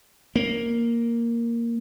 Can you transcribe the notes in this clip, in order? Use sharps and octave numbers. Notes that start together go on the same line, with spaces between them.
A#3